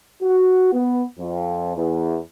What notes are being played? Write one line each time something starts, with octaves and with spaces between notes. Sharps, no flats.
F#4
B3
F2
E2